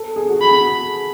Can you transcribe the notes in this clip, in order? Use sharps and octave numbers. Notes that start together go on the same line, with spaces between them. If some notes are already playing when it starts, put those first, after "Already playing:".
Already playing: A4
G#4
F#4
G#4 B5